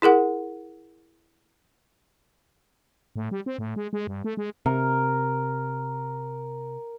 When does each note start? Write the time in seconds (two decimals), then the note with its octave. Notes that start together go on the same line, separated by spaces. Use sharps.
0.02 E4 G#4 A#4 F#5
3.16 A2
3.31 G3
3.46 C4
3.58 A2
3.76 G#3
3.93 G#3
4.07 G2
4.24 A3
4.37 G#3
4.66 C3 A#4